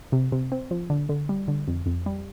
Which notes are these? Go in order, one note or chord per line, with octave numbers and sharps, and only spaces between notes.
C3
C3
C4
F3
D3
D3
G3
D3
F2
F2
G3